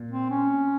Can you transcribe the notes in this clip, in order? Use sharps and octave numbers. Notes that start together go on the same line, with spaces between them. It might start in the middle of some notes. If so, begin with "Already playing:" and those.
Already playing: A#2
C4
C#4